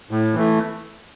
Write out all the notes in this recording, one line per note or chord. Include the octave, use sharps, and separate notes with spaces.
A2
E3 A3